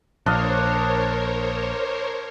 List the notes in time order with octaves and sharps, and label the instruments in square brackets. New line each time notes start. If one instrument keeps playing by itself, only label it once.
[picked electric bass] A#1 [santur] D4 D#5 F5 [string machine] A#4 C5 C#5